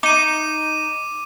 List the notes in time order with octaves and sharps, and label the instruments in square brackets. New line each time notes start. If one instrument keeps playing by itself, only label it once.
[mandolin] D#4 [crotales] D6 D#7